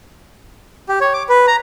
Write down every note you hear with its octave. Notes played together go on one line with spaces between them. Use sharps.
G4
C#5
D6
B4
A#5